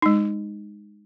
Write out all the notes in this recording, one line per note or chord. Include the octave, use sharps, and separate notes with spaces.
G#3 D#4